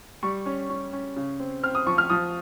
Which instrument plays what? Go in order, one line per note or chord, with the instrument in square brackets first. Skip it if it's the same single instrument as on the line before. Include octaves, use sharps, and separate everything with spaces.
[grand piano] G3 C#6
C#4
C#4
C#4
C#3
C4
C4 F6
D#6
F3 C#6
F6
F3 D#6